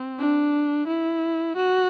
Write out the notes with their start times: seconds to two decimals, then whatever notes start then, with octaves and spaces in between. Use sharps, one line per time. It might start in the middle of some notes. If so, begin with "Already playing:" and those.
Already playing: C4
0.19 D4
0.88 E4
1.57 F#4